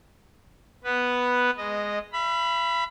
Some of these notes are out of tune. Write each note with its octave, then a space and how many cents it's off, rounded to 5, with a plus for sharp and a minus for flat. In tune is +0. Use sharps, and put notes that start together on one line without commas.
B3 +0 B4 +0
G#3 +0 D#5 -10
E5 +45 B5 +0